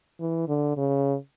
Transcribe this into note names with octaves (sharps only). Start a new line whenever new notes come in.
E3
D3
C#3